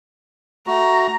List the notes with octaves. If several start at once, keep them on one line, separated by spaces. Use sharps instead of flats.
A3 F#4 A#5